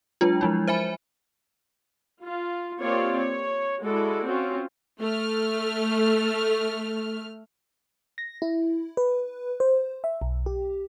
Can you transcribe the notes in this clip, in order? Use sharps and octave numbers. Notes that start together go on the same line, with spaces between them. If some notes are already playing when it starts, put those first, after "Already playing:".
F#3 G#3 D4 F4
F3 G#3 E4
C5 E5 G#5 B5
F4
A#3 C4 F4 G4 C#5 D5
C#5
G#3 E4 F#4 A4 D5
C4 C#4 F4 F#4
A3 F6
A#6
E4
B4
C5
E5
B1
G4